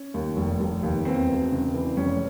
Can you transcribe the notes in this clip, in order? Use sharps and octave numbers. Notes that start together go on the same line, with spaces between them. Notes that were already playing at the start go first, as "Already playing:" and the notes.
Already playing: C#4
D#2
F1
F1
D#2
E2 C4
E1
C#3
E3
F1 C#4